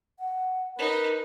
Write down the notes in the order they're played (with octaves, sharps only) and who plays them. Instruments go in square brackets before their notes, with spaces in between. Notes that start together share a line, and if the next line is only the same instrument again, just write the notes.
[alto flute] F#5
[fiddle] D#4 [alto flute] A#4 [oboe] B4